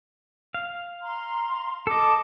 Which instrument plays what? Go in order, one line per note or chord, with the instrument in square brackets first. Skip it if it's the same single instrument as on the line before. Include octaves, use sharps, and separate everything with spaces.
[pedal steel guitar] F5
[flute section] A#5 C6
[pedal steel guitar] A4 D#5 [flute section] A5 D6